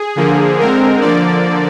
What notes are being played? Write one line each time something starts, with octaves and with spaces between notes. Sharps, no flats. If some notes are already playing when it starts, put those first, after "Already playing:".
Already playing: G#4
D3 F3 A#3
D3 G#3 C4 A#4
D3 F3 A#3 D5